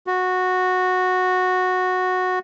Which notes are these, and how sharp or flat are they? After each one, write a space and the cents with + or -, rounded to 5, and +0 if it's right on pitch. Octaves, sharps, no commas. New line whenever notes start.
F#4 -10